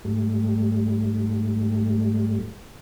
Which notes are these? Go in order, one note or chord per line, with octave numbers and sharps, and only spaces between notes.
G#2 G3 A3